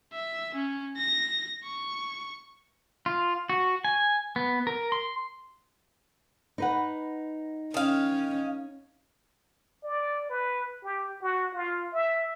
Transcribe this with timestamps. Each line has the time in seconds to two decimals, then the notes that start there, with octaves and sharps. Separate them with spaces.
0.13 E5
0.55 C#4
0.97 A#6
1.64 C#6
3.06 F4
3.49 F#4
3.85 G#5
4.36 B3
4.67 A#4
4.92 C6
6.58 D#4 B4 F#5
7.74 D#3 C#4 F5
9.83 D5
10.30 B4
10.84 G4
11.22 F#4
11.54 F4
11.93 E5